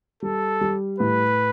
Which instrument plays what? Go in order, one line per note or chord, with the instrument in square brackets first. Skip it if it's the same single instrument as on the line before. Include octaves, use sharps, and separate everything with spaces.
[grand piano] G3 [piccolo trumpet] A4
[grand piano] G3
[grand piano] A2 [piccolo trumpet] B4